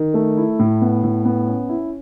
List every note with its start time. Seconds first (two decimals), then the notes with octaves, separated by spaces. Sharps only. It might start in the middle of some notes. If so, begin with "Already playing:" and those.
Already playing: D#3
0.14 A3
0.37 E4
0.59 A2
0.82 B3
1.03 A2
1.25 B3
1.47 C#4
1.69 E4